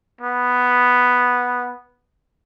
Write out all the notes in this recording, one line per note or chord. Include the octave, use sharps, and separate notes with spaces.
B3